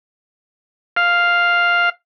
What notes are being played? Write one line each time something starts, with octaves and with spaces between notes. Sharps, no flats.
F5